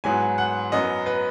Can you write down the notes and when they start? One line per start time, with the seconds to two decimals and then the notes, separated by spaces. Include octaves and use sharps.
0.04 G#2 F#3 B3 G#5
0.38 F#5
0.72 F#2 F#3 B3 D#5
1.06 B4